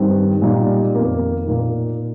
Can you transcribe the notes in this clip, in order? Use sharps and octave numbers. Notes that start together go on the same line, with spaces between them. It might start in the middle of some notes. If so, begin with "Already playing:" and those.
Already playing: G2 D#3 C4
A#2 G3 D#4
F2 D#3 A#3
A#2 A#3 D#4